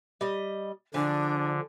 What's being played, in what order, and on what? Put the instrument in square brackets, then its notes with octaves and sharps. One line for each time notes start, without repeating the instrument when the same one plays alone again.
[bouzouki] G3 D#5
[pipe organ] D3 [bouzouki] F3 G#4 [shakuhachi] D4